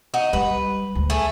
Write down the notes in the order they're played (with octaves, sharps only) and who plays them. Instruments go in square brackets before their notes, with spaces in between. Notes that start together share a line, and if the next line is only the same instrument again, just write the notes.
[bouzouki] D#4 F#4 D#5
[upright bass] G3 [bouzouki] B4
[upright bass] D2
[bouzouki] A3 G#4